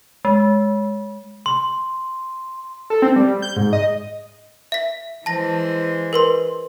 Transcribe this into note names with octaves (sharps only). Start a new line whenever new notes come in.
G#3
C6
A4
C4
G3
G6
G#2
D#5
E5 B6
E3 G#3 C5 A5 A#6
A#4 B4 C6